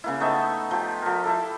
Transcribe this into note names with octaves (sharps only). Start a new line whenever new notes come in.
C#3 A#3 E4
A3 B3 D#4 E5
F3 G4
F3 A#4
E4 A4